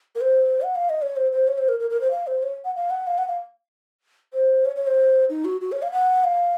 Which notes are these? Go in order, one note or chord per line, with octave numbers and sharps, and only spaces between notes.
A#4
C5
F#5
F5
D#5
C#5
C5
C5
C#5
C5
A#4
A#4
A#4
C5
F5
C5
C#5
F#5
F5
F#5
F5
F#5
F5
C5
C#5
C#5
C5
D#4
F#4
F#4
C#5
F5
F#5
F5